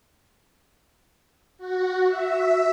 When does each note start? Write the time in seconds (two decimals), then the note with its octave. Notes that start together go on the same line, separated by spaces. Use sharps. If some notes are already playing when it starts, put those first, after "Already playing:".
1.58 F#4
2.07 E5